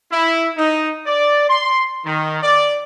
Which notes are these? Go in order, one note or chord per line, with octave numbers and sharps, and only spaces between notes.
E4
D#4
D5
C6
D#3
D5